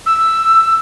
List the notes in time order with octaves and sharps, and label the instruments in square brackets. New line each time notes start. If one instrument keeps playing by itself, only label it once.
[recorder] E6